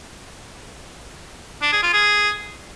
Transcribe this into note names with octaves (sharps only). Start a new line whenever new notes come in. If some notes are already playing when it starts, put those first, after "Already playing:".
D4
G#4
F4
G#4